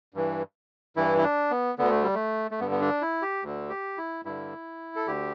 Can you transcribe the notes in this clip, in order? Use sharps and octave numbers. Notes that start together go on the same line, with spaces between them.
G2 E3
G2 E3 E4
E4
D4
B3
D2 D3 B3
A3
G3
A3
A3
G2 D3 B3
B3
D4
E4
G4
D2 D3
G4
E4
G2 D3 E4
A4
D2 D3 G4